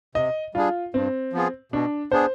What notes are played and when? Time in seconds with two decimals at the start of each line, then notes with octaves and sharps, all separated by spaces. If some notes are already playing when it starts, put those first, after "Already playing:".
0.15 C3 D#5
0.55 G3 D4 F4 G#4
0.94 G2 C4
1.33 F3 B3 F4 G#4
1.72 B2 D4
2.11 B3 D4 G#4 C5